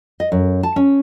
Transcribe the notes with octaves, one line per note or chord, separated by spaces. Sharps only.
D#5
F#2
A5
C#4